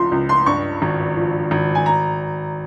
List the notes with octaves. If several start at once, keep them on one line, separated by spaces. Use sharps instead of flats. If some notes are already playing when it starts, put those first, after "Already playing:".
Already playing: C#2 F3 C6
C#2
C6
G2 C#6
G#1
F3
G#1
G#5
A#5